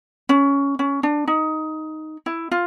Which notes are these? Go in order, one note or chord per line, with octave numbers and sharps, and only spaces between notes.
C#4
C#4
D4
D#4
E4
F4